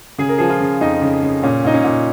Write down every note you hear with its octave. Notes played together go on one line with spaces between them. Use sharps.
C#3 G#4
A#4
F3 G#4
F4
C#3
F2 D#4
C#3
C#3
A#2 C#4
A#2 D#4
C#4
A#2